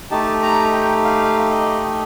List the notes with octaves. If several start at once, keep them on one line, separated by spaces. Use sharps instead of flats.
A3 D#4 G4 A5
A#5
G5
F5
D#5